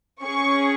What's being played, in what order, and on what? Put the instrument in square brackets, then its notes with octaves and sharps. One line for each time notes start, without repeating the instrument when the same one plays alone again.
[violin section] C#4 G#4 C#6